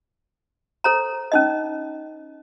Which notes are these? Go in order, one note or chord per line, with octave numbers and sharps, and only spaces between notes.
A4 C5 A#5
C#4 D#4 D#5